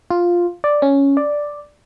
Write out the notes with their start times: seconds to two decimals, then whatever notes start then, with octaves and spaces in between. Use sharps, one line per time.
0.10 F4
0.64 D5
0.82 C#4
1.17 D5